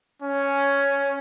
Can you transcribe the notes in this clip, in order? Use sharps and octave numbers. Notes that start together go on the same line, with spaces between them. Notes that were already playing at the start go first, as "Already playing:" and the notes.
C#4